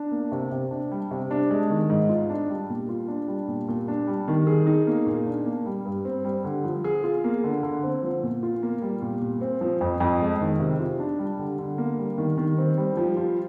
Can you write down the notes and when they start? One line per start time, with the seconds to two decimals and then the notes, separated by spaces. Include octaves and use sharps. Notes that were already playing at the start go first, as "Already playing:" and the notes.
Already playing: D4
0.11 A#3
0.32 C3
0.51 C3
0.71 D4
0.91 G3
1.11 C3
1.31 D4
1.50 G#3
1.70 D#3
1.90 G#2
2.09 F4
2.30 D4
2.50 G3
2.70 A#2
2.89 F4
3.08 D4
3.28 G3
3.48 A#2
3.68 A#2
3.88 D4
4.07 G3
4.28 D#3
4.47 G#4
4.67 D#4
4.87 A#3
5.06 A#2
5.27 D4
5.46 A#3
5.66 G3
5.85 G2
6.05 C4
6.25 G3
6.44 D3
6.64 F3
6.84 G#4
7.04 F4
7.24 A#3
7.44 D3
7.63 D3
7.83 C4
8.03 F3
8.23 A#2
8.43 F4
8.63 A#3
8.82 G3
9.02 A#2
9.21 A#2
9.41 C4
9.61 F3
9.81 F2
10.00 F2
10.20 G#3
10.40 D#3
10.59 C3
10.80 F4
11.00 D4
11.19 G3
11.39 D3
11.59 D3
11.78 A#3
11.98 G3
12.18 D#3
12.38 D#3
12.58 C4
12.78 G3
12.97 F3
13.17 F4